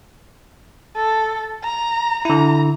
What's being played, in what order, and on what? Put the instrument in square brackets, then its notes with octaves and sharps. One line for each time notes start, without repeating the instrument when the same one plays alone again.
[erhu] A4
A#5
[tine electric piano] D3 E4 [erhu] A#5